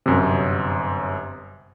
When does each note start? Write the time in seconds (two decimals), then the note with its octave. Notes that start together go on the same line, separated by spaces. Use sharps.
0.06 G1 F#2 C3